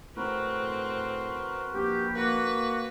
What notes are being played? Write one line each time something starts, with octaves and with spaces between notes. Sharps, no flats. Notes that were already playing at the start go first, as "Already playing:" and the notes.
A2 C4 F#4 A#4 B4
A#1 G4
A#3 F#4 B4